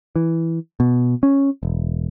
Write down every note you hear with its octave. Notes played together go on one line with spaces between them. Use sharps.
E3
B2
C#4
E1